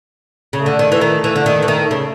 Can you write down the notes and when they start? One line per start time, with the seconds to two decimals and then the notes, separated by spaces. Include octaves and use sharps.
0.53 C#3 A3
0.66 D3
0.79 D#3
0.92 E3
1.01 D#3
1.24 E3
1.36 D3
1.46 D#3
1.62 E3
1.68 D#3
1.91 C#3